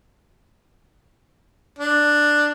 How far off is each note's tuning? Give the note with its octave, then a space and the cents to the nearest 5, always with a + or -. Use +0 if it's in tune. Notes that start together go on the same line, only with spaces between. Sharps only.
D4 +5